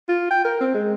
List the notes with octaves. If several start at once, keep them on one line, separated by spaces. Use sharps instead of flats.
F4
G5
A#4
C4
G#3